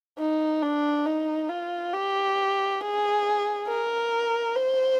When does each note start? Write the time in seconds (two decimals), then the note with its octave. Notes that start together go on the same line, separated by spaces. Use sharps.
0.18 D#4
0.62 D4
1.06 D#4
1.49 F4
1.93 G4
2.81 G#4
3.68 A#4
4.56 C5